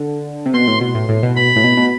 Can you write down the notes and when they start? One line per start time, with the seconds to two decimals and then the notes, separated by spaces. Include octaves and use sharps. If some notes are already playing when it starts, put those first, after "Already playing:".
Already playing: D3
0.46 C3
0.54 B2 C6
0.67 A2
0.81 B2
0.95 A2
1.09 A2
1.23 B2
1.36 B2 B5
1.56 A2
1.64 B2
1.77 B2